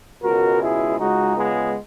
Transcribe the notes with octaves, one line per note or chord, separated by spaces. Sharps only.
C#2 B2 G#3 F#4 A#4
E4 G#4
C#2 C#3 G#3 D#4 F#4
G#3 B3